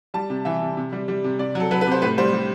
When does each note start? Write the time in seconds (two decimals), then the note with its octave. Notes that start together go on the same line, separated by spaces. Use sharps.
0.14 G3 A5
0.30 C3
0.45 E3 E5
0.61 C3
0.77 C3
0.93 G3
1.08 G3
1.24 C3
1.39 C3 D5
1.55 F#3 A4
1.71 F#3 B4
1.81 B4
1.87 C3 C5
2.02 A2 B4
2.18 G3 C5
2.33 G3